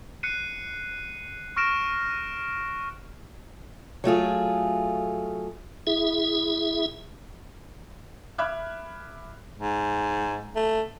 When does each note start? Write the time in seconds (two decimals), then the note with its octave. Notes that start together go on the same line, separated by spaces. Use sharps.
0.23 F#6 C7 C#7 D#7
1.56 C#6 F6 A#6 D7 E7
4.04 F#3 A3 F4 G#4
5.87 E4 G#4 E5
8.38 E5 B5 D6 F6 F#6 G#6
9.58 G#2
10.56 A3